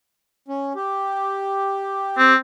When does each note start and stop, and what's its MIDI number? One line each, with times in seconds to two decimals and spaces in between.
0.48 0.73 61
0.75 2.33 67
2.18 2.36 60